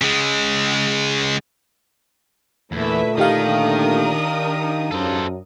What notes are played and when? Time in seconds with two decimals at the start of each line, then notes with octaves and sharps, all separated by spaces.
0.02 C#3 G#3
2.72 E2 A#2 D3 A3 E4 B4 E5
3.18 D#3 D4 D#4 G4 A#4 F5 D#6
4.91 F#2 A4 C5